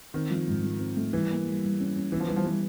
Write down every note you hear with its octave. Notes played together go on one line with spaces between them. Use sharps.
D#3 C4
F3
G#2
F3
C4
A3
E3 G3
A#3
G3
G3
C#4
C#4
E3 B3
F3
E3 G3
F3
E3 G3